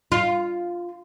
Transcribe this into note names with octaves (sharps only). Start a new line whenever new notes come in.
F4